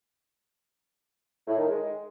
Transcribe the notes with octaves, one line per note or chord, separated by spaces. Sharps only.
A2
D#3
G#3